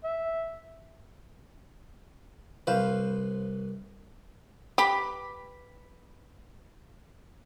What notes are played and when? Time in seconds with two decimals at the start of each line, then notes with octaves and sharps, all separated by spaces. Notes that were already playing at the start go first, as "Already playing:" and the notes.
0.04 E5
2.67 C2 B4 C5 F5
4.78 G4 B4 B5 D6